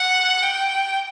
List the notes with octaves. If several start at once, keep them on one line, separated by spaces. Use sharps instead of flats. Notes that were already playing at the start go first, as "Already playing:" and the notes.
Already playing: F#5
G5